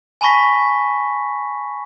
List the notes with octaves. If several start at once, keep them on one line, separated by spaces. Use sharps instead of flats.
G#5 A5 B5 C#6 A#6 B6